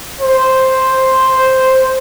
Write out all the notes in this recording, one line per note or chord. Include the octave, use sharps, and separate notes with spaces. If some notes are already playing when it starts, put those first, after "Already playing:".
C5